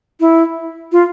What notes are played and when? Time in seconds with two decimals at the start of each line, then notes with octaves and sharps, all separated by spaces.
0.20 E4
0.92 F4